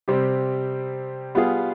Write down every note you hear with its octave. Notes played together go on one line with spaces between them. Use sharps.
C3 G3 C4 G4
G3 B3 F4 G#4